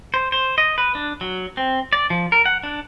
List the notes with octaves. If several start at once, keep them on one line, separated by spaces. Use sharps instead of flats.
C5
C5
D#5
B4
D4
F#3
C4
D5
F3
A#4
F#5
D4